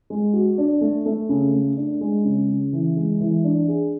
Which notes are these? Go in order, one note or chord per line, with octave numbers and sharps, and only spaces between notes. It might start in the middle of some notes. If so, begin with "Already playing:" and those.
G#3
F#4
D4
A3
A3
C#3
A3
D4
G#3
C#3
C#3
E3
G#3
E3
D4
G#4